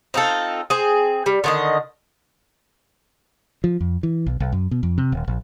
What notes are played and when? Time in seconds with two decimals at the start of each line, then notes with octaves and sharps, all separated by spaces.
0.14 C4 D#4 F4 A4
0.70 C4 G#4
1.26 G3
1.44 D3 D#3 D#5
3.64 F3
3.80 F2
4.03 E3
4.26 B1
4.40 B1
4.52 F#2
4.71 B2
4.83 F2
4.98 C3
5.12 D#1
5.28 A#1